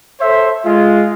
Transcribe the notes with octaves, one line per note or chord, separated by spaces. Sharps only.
A4 C5 C#5 E5
G#3 F4